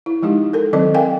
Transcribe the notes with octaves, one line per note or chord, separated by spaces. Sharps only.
E4
F3 G#3 D#4 G4
A4 A#4
D#3 F#3 C4 A4 D5 D#5
A#4 F5 G5 G#5